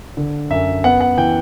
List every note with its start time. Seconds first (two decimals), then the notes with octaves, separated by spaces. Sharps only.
0.17 D3
0.50 F#2 E5
0.84 B3 F#5
1.01 F#5
1.17 E3 G5